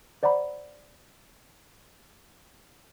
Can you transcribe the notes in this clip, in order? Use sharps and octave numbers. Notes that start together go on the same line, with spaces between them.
C5 D5 F#5 A#5 B5